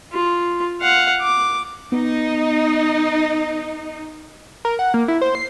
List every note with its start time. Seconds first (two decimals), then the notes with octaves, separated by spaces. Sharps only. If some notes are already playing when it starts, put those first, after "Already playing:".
0.13 F4
0.81 F5 F#5
1.22 D6
1.92 B3 D#4
4.65 A#4
4.79 F#5
4.94 A#3
5.08 E4
5.21 C5
5.35 C7